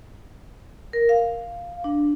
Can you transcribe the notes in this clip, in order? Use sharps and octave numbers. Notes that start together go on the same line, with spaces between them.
A#4
F5
D4